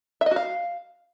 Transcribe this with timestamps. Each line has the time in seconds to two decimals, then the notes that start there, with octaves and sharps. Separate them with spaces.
0.21 E5
0.26 D#5
0.31 F#4
0.36 F5